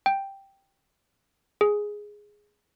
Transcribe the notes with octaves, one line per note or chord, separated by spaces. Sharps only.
G5
G#4